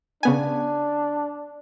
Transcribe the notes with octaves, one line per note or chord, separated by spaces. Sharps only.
C#3 B3 D4 G#5